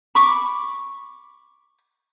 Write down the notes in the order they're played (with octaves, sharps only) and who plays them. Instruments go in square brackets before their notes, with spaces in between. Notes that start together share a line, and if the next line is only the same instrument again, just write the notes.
[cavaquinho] B5 C#6 D6